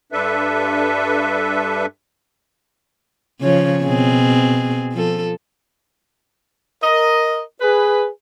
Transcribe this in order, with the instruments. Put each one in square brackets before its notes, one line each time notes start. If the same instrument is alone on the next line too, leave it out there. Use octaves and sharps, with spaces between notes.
[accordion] G2 D4 A4 B4 E5
[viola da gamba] C#3 F3 C#5
B2 C4 G#4
F3 A4
[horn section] A#4 D#5
G#4 B4